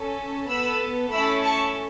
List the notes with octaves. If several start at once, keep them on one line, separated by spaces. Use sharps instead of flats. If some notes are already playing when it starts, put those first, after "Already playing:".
Already playing: C#4 A4
B3 A4 B5 E6
A3 C#4 E4 A4 B5 E6
A5 C#6